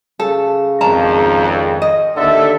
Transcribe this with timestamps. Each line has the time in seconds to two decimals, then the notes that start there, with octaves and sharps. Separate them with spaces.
0.20 C#3 A4
0.81 G#1 F2 C#4 A5 A#5
1.82 D#5
2.17 D#2 D3 A4 E5